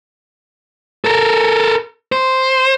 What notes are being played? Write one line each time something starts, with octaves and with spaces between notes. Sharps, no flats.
A4 A#4
C5